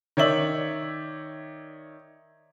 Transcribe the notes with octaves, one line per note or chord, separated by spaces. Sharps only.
D#3 C#5 D5 E5 F#7